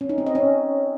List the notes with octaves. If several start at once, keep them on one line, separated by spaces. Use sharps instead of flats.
C#4
D#4
C4
D#5
C#4